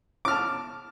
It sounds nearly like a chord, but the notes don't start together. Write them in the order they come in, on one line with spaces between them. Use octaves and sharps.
D6 F6 A5